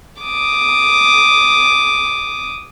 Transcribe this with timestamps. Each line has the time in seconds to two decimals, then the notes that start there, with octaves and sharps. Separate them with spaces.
0.22 D6 D#6